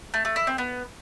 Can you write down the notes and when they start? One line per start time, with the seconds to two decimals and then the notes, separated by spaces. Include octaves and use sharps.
0.14 A3
0.25 A3
0.36 E4
0.47 C4
0.58 B3